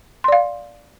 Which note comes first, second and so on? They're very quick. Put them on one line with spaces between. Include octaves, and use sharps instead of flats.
C6 D5 F5